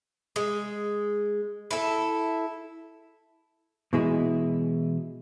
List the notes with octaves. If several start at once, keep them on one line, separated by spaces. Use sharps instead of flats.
G#3
E4 A4
B2 E3 G#3 E4 G#4